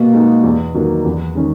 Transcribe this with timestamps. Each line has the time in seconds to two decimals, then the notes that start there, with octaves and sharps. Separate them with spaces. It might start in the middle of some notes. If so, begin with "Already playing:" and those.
Already playing: B2 A#3
0.13 G#3 D#4
0.43 E2
0.74 D#3 F#3 A#3
1.04 E2
1.35 D#3 G#3 C#4